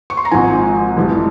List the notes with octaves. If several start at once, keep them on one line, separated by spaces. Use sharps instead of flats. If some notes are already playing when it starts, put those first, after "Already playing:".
C#6
C6
A#5
G#1 G#2 F3 G#5
F1 F2 E3 G3